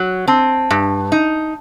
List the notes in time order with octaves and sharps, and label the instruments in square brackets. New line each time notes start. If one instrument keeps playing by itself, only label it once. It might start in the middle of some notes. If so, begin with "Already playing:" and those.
Already playing: [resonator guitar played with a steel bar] F#3
[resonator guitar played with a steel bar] C4 [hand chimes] A5
[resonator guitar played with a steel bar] G2
D#4